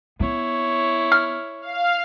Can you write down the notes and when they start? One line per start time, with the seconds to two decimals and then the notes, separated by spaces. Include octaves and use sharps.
0.20 B3 E4 C#5
1.12 F6
1.61 F5